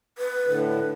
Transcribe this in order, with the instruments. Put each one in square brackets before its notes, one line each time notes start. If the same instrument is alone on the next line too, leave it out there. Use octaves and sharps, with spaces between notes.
[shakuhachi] B4
[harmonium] A2 D3
[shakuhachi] B4